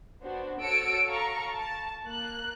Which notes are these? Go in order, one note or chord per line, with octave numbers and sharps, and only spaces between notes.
B3 D4 F#4 C5
F#4 A4 C#5 E6 C#7 D7
A4 F5 A#5 C#6
A5
A#3 F#6